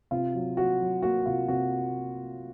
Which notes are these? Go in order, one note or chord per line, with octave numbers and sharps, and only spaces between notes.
C3 F4
F#3
F#3 F#4
F#3
A#3 F#4
C3 F4
C3 F#4